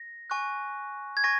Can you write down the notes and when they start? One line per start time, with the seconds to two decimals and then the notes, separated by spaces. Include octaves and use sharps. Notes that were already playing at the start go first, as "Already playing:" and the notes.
Already playing: A#6
0.30 G#5 C#6 F#6
1.17 G#6
1.23 G#5 C#6 A#6